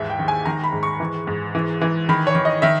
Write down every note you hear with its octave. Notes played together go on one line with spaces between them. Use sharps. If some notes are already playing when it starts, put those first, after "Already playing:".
Already playing: D#2 G#2 E3 E5
G5
D#3
G#5
D#3 A#5
B5
G#2
C#6
E3
G#2
E3
E3
D#3 B5
C#5
D#3
D#5
D#3 E5